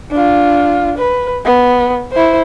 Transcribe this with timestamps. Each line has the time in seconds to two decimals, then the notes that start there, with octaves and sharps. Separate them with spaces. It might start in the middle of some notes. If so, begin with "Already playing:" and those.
0.11 D4 F4
0.98 B4
1.45 B3
2.11 E4 C5